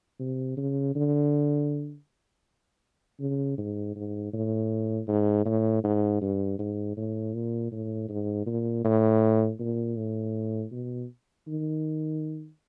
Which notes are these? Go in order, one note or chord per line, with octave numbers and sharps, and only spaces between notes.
C3
C#3
D3
C#3
G#2
G#2
A2
G#2
A2
G#2
G2
G#2
A2
A#2
A2
G#2
A#2
A2
A#2
A2
B2
D#3